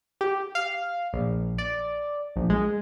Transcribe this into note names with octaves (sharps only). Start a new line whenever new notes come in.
G4
F5
A#1
D5
A#1
G#3